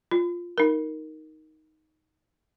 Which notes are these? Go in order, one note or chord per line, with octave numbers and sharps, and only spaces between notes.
F4
D#4 A#4